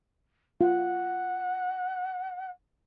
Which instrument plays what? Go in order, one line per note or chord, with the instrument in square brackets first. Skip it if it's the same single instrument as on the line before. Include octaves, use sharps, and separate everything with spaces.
[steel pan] F4 [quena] F#5